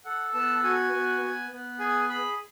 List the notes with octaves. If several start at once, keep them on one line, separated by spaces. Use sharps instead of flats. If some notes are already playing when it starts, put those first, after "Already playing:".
A4 F#5
B3 A5
F#4 G#5
B3
B3
B3
G#4 G#5
G#4 B5